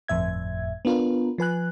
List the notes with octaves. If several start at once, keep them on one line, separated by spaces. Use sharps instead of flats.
G1 F2 A2 E5 G#6
B3 D4 F4 A#4 B4
F3 B4 G#5 F#6